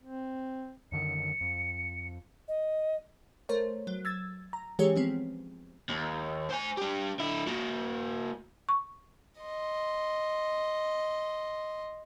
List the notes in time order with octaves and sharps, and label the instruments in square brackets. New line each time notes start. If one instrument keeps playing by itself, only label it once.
[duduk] C4
[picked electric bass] F#2 D3 D#3 [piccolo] C#7
[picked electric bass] F2
[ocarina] D#5
[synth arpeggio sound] A3 A#4 C5 C#5
F#3
E6 G#6 A6
A#5
E3 G#3 C#4 G4 G#4 C#5
F3 B3 C4
[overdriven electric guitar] D#2
C5 G#5
D4 G4
D3 E4
A#3 F#4
[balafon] C#6
[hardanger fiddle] D#5 C6